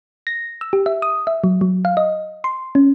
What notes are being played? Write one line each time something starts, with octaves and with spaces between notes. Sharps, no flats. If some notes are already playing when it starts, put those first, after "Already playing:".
A#6
E6
G4
E5
D#6
E5
F#3
F#3
F5
D#5
C6
C#4